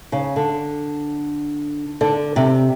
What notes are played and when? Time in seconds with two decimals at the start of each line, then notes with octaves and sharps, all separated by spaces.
0.12 C#3
0.36 D3
2.01 D3
2.36 C3